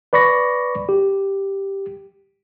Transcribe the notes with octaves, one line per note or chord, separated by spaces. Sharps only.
B4 D5 B5 C#6 A#6
G4